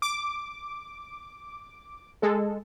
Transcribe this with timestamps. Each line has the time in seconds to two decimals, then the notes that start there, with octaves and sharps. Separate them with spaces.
0.02 D6
2.22 G#3 A4